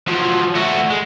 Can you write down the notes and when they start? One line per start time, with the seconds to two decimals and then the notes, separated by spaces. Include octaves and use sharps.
0.07 F3 F#3
0.55 A3 F#4
0.90 G#3